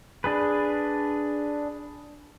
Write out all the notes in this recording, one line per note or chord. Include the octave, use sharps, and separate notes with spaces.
D4 G#4 B4